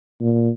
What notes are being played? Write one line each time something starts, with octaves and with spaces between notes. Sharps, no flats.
A#2